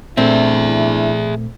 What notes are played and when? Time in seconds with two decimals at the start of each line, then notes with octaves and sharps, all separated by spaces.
0.17 A#2 A3 C4 D4 E4 G#4 A4 E5